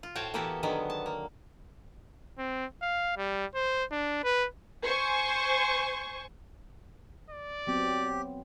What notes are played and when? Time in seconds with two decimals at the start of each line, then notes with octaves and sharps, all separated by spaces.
0.03 F4
0.15 A2 F#4 C5 C#5 G5 A5
0.34 E3 A#3 B3 F#4 G4 A4
0.63 D3 D#3 F#3 G#3 B3
0.90 A5
1.06 A#3
2.38 C4
2.82 F5
3.17 G3
3.55 C5
3.91 D4
4.24 B4
4.85 C5 G#5 C#6
7.30 D5
7.67 F#3 B3 C4 G4